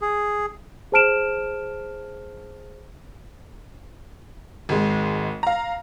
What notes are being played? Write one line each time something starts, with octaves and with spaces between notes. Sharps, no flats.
G#4
G#4 C5 A5 F6 D7 E7
G#1 G#3
F5 A#5